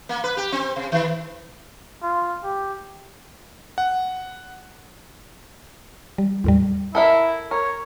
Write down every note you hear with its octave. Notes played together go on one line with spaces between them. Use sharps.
A#3
B4
G4
C4
C3
D#3
F4
G4
F#5
G3
E2 A2 G3
E4 A4 A#4 E5
A#4 C#5